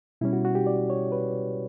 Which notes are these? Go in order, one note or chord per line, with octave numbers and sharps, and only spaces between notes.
B2 G3 C#4 E4
F#4
F#4
G4
D5
C#5
B4